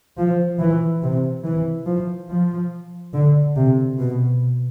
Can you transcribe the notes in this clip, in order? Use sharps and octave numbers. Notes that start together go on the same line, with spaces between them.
F3
E3
C3
E3
F3
F3
D3
C3
B2